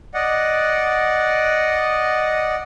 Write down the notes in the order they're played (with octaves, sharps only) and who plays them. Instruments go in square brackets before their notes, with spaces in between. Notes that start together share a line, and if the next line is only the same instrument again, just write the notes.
[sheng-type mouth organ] D5 D#5 F#5